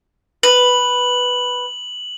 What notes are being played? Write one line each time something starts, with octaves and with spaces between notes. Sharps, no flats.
B4 F#7